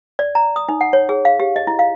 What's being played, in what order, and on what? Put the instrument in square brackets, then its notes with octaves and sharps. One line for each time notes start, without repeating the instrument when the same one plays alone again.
[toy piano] D5
A#5
D#6
D#4
F#5
C#5
G#4
F5
G4
D#5
E4
F5